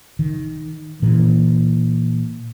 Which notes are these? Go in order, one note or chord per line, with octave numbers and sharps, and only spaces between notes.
D#3
A#2 E3